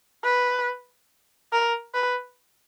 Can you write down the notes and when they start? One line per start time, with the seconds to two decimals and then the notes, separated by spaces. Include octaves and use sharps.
0.24 B4
1.53 A#4
1.94 B4